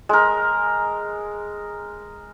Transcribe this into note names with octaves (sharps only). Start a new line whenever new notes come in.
G#3 A#4